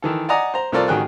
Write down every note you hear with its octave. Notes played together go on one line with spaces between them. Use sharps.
D#3 E3 A4
D5 D#5 F#5 G#5 A#5 D#6
C5 A#5
C2 C4 F4 A4 A#4 D5
A1 D#3 F#4 G#4 G5 F#6